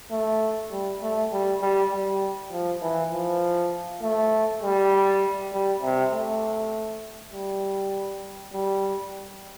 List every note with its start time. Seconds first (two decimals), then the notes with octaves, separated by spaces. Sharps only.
0.11 A3
0.71 G3
1.02 A3
1.32 G3
1.61 G3
1.93 G3
2.52 F3
2.82 E3
3.12 F3
4.02 A3
4.63 G3
5.52 G3
5.82 C3
6.12 A3
7.32 G3
8.53 G3